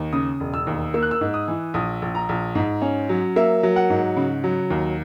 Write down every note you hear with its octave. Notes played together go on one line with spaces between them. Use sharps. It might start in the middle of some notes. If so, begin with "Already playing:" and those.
Already playing: D#2
C#3 D#6
E1
E6
D#2
A#3 E6
F#6
E6
G#2
D#6
E3
A#1 D#6
A#1
A#5
A#1
G#2
C#4
F#3
A#3 E5
F#3
F#5
G#2
C#3
F#3
D#2